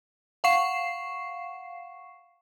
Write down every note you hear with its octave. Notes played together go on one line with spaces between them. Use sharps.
F5 F#5 C#6 C7 E7